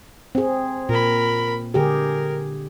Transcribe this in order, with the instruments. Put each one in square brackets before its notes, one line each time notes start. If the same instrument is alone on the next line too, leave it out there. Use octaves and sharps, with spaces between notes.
[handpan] C4 G#4
[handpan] A#2 [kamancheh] A#4 B5
[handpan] D3 G4 G#4 [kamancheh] A#4